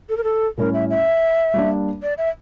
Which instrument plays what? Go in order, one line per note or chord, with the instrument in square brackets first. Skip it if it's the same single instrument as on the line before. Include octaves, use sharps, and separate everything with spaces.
[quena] A4
A#4
A4
[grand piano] A2 G3 C#4 E4 [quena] A#4
[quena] E5
E5
[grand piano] G3 A#3 D4
[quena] D5
E5